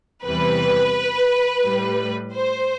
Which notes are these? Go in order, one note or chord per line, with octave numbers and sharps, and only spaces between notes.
E2 C3 E3 G3 B4
A2 G3
C5